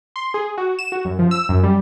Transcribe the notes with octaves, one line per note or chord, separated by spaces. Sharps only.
C6
G#4
F#4
E7
F#4
F#2
F3
E6
F#2
G3